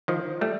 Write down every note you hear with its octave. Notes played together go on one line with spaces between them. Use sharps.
D#3 F3
G3 A3